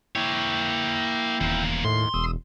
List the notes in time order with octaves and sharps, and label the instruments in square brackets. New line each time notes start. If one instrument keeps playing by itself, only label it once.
[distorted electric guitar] A#3 C#5 [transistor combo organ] E4 G5
[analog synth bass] D#1 [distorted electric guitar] E2 A#3
[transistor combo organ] D#2 [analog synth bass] A2 [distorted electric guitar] C6
[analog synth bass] E1 [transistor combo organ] D#6 E6